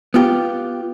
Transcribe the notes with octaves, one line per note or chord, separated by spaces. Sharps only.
B3 F4 G4